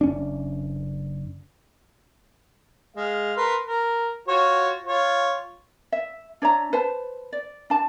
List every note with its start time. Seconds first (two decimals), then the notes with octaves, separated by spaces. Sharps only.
0.01 F#1 C#4 D4
2.96 G#3 F5
3.37 A#4 B4 C6
3.66 A#4
4.28 F4 F#4 C#5
4.86 F4 C#5
5.92 E5
6.42 D4 C#5 E5 A#5
6.73 B4 C5 A5
7.33 D5
7.70 D4 A5